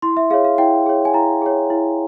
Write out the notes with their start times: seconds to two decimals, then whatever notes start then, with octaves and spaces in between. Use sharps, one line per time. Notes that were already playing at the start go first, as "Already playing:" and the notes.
0.02 E4 C6
0.17 E5
0.30 G#4 C#5 F5
0.45 F5
0.58 E4 G5
0.86 G#4 C#5
1.05 G#5
1.14 E4 A#5
1.42 G#4 C#5
1.70 E4